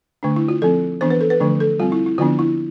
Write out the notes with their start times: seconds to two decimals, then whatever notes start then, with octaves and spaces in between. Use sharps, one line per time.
0.23 D3 A3 D4
0.36 E4
0.48 F4
0.62 F3 C4 A4
1.01 E3 B3 D4 C5
1.10 B4
1.21 A4
1.30 B4
1.40 D3 F3 A3 D4
1.60 A4
1.80 G3 C4 F4
1.92 E4
2.06 E4
2.18 D3 F3 B3 D4 F4
2.39 E4